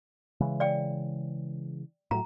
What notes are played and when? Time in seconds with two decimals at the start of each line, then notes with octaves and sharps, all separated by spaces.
0.41 C#3 E3 G#3
0.60 D5 G5
2.11 A2 F#3 A#5